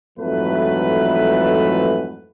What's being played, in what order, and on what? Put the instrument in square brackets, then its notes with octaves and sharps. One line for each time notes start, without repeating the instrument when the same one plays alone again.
[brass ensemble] F2 G#2 E3 F#3 A3 B4